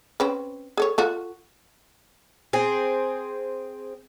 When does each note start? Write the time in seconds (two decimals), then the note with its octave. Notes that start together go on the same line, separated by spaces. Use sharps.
0.20 C4 C#4 B4
0.77 G#4 A4 C#5
0.98 F4 F#4 A4
2.53 C4 G#4